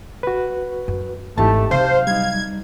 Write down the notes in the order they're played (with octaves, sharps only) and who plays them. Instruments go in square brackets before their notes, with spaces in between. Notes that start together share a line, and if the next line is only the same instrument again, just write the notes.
[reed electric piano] F#4 B4
[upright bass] F#2
[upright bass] G#1 E3 [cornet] A3 [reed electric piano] D#4 G4 A5
[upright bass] C3 F#3 [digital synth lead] C5 [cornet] F5
[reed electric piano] G3 D#4 [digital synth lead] G#6